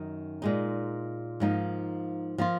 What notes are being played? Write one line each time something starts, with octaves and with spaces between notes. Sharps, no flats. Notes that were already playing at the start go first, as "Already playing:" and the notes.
Already playing: F#2 D#3 D#4
A#2 G#3 D#4
G#2 F3 A#3 D#4
F3 A#3 F4